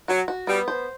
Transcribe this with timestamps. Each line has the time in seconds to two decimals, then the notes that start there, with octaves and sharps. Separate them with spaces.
0.08 F#3 F#4
0.28 F#4
0.47 G3 B3
0.68 C5